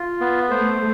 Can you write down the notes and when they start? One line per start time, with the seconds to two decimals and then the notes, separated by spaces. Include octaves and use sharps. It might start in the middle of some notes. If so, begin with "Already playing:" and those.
Already playing: F4
0.21 B3
0.50 A3 C5